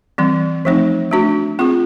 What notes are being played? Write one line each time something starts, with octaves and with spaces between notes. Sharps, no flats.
E3 G3 C4
F3 A3 C4 D#4
A3 D4 F#4
C4 F4 G#4